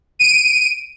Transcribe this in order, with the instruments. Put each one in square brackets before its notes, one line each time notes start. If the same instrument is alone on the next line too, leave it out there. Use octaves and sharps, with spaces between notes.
[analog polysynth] D7 D#7